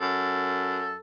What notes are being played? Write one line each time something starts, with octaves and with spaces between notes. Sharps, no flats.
F#2 A4